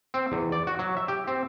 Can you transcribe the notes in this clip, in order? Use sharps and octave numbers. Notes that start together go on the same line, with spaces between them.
C4
E2
D5
F#4
F#3
E5
G4
C4